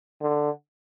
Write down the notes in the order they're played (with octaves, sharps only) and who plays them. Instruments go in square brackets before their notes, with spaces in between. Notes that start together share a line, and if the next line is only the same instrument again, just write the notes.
[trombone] D3